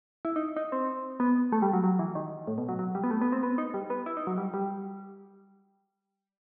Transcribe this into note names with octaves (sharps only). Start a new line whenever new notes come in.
E4
D#4
D#4
C4
B3
A3
G3
F#3
F#3
E3
D#3
A2
B2
F#3
F#3
G3
B3
A3
B3
C4
B3
D#4
G3
B3
E4
D#4
F#3
G3
G3